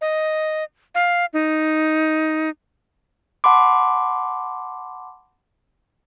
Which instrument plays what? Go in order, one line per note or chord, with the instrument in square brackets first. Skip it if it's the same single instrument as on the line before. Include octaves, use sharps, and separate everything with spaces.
[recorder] D#5
F5
D#4
[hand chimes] F#5 A5 B5 C6 D6